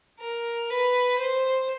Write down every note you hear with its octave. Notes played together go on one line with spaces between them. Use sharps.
A#4
B4
C5